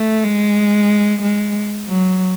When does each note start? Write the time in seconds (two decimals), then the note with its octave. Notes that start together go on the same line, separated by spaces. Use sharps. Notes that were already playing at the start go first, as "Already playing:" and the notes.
Already playing: A3
0.24 G#3
1.22 G#3
1.88 F#3